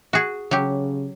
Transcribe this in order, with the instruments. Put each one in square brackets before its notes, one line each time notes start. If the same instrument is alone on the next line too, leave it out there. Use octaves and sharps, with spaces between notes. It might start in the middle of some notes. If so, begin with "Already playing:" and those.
[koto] F#4 G#4
[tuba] C#3 [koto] F#3 G4